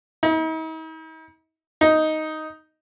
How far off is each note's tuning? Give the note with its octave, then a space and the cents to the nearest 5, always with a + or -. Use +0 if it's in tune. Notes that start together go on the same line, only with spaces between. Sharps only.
D#4 +45
D#4 +5